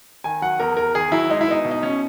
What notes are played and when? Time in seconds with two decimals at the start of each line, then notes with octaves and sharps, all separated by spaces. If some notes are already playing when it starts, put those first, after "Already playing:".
0.24 D#3 G#5
0.42 F#3 F#5
0.59 E2 A#4
0.77 E2 A#4
0.95 D#3 G#4
1.12 F#3 E4
1.30 G#3 D#4
1.41 E4
1.48 B3 D#4
1.65 B2
1.71 D#4
1.83 B2 C#4